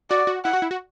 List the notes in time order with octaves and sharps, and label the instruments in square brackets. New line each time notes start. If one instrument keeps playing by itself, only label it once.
[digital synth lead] F#4 [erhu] D5
[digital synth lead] F#4
[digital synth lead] E4 [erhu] F#5
[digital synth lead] F#4
E4
F#4